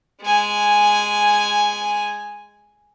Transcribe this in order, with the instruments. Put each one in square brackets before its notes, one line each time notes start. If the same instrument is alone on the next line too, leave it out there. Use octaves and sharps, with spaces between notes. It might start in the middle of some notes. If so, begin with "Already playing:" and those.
[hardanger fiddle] G#3 G#5